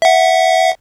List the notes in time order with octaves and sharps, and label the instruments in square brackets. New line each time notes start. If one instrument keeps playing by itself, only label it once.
[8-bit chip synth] E5 F#5